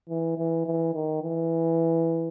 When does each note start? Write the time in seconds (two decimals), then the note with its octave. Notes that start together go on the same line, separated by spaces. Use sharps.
0.09 E3
0.38 E3
0.66 E3
0.94 D#3
1.22 E3